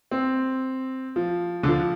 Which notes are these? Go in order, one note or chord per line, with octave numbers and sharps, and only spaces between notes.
C4
F3
D3
F3